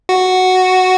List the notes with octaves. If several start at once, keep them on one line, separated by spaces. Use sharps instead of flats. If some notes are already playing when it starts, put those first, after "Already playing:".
F#4